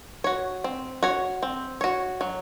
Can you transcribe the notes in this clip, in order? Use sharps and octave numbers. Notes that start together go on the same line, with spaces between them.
F#4 C#5
C4
F#4 C#5
C4
F#4 C#5
F#3